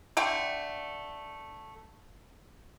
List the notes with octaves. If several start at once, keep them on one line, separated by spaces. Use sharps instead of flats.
D3 A3 G5